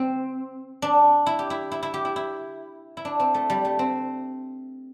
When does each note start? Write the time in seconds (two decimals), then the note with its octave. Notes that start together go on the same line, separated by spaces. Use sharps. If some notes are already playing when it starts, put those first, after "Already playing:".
Already playing: C4
0.82 D4
1.26 E4
1.39 G4
1.50 E4
1.71 E4
1.83 E4
1.94 G4
2.05 E4
2.16 E4
2.97 E4
3.05 D4
3.20 C4
3.34 A3
3.50 G3
3.65 A3
3.79 C4